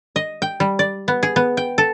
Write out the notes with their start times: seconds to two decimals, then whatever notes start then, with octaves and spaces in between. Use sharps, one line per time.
0.16 D#5
0.42 G5
0.60 G3
0.79 D5
1.08 B3
1.23 G#4
1.36 B3
1.57 G5
1.78 A4